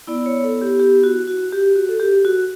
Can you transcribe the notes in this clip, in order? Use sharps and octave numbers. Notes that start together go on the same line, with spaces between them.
B3 E4 D5
C#5
A4
G4
G4
F#4
F#4
G4
F#4
A4
G4
F#4